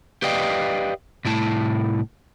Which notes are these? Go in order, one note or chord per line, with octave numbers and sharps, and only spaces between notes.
G4 B4 D5 D#5 F5 G5
C2 A2 E4 A5